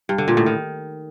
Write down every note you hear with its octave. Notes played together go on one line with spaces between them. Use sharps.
G2
D3
A#2
A2
D#3